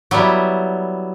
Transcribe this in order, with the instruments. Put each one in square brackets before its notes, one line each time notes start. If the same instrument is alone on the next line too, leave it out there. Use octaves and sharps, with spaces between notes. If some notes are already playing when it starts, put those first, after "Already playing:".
[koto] F#3 G3 B3 E4